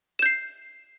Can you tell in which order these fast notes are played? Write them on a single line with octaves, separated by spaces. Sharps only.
E7 G6 C7